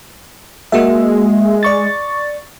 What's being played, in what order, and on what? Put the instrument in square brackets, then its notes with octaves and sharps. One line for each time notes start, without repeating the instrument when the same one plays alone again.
[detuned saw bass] G#3 [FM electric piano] A#3 F#4 E5
[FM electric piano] D5 C#6 A6